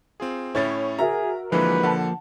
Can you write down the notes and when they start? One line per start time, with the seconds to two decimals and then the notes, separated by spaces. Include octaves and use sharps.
0.20 C4 F4 G#4
0.55 A2 C#4 E4 C#5 A6
0.99 F#4 G#4 A#4 E5 A#5
1.52 D3 E3 F3 G#3 A#3 B4
1.83 D3 F#5 A5